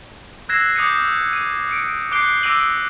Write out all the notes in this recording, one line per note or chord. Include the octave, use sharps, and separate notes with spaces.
E6 F#6 G#6 A#6 C7 E7
D6 D#6 G6 C#7 D#7
D#7
C#7 D7
D6 F#6 G6 C7 D7 G7
D6 E6 A#6 D7 D#7 F#7